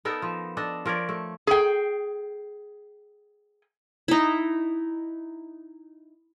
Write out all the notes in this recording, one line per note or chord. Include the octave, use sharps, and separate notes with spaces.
B3 D#4 A4 A#4
F3
D4 A4 D#5
F3 A#4 C#5 D5
A3
G#4 G5
D#4 E4